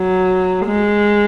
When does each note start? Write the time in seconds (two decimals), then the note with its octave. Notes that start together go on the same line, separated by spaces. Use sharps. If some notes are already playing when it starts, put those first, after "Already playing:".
Already playing: F#3
0.66 G#3